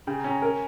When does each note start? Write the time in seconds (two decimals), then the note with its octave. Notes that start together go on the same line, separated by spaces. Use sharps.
0.07 C#3 G5
0.19 A#5
0.24 C#4
0.31 A#5
0.42 A#4 G#5